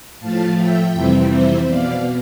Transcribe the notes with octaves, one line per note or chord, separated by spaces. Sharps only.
A2 F3 A3 F5 A5
E5 G5
F2 C3 E3 G3 C4
C5 E5
B2 B3 D5 F5